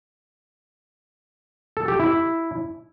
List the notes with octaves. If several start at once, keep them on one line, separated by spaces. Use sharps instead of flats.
A4
G4
E4